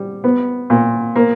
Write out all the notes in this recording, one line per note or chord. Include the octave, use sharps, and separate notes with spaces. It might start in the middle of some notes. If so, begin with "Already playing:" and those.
Already playing: G3
B3
A#2
A#3